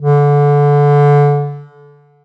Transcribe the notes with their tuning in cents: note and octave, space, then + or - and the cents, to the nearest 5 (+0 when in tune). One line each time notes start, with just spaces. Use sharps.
D3 -25